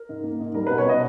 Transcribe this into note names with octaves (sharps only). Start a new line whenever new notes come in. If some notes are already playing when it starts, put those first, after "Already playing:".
Already playing: A#4
G#2
A#3
G#2
G3 A#4
B2 B4
C#5
B2 D#5